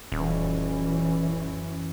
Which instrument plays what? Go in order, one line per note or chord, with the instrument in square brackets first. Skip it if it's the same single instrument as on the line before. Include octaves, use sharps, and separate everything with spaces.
[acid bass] D#1 [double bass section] F#2 E3 C#4